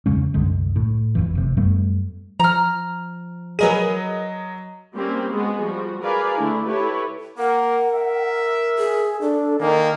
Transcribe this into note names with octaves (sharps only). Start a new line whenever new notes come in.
E2 C#3 G#3 C#4
C2 F#2 D3 G#3
A2
G#1 F2 E3
F1 C3
F#2 G3 A3 B3
F3 A#5 F6
F#3 G#4 A#4 B4 D#5 D#7
G3 A#3 C4 C#4 G4
G#3 B3 F#4 G#4
F3 G3 F#4
G#4 A#4 B4 D5 F5 G#5
D3 A3 D4 E4
E4 G4 A4 B4 C#5
A#3 A#4 F#5
E5
G#4
D4 A4
D#3 A#3 G#5